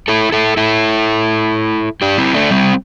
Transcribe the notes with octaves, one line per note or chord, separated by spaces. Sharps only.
E4 A4
E4 A4
E4 A4
D4 G4
C4 E4
A3 D4
G3 C4